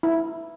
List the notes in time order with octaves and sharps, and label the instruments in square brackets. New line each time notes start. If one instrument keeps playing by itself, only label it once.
[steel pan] E4